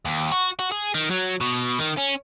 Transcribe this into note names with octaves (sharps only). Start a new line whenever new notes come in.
D#2
F#4
F#4
G#4
D#3
F#3
B2
D#3
C#4